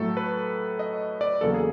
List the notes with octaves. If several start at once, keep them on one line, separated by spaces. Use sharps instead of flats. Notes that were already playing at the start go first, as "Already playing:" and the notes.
Already playing: A2 F#3 A3 A4
B4
D#5
D5
E2 C#3 F#3 A#3 A4
G#4